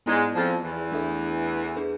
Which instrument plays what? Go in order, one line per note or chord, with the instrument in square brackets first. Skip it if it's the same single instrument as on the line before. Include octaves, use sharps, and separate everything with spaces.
[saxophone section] G#2 G#3 [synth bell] B3 E4 G#4 D5
[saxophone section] F2 F3
E2 E3
[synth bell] A3 D4 A4 E5
D4 G#4 B4